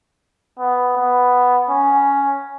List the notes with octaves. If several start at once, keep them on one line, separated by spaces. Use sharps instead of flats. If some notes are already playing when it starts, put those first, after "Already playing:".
B3
B3
C#4